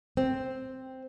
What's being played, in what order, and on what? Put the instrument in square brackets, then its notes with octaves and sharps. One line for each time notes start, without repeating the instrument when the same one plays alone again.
[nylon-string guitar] C4